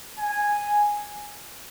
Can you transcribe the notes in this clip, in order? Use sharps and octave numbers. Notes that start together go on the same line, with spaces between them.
G#5